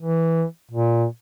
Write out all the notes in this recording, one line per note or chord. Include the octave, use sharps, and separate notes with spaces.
E3
A#2